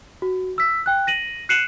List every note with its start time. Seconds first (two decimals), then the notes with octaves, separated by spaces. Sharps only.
0.22 F#4
0.58 E6 B6
0.86 G5 F#6
1.07 A#6 D#7 F#7
1.49 F#6 C7 C#7 D#7 E7 F#7